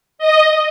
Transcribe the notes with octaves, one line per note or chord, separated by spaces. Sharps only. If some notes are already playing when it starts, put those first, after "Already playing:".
D#5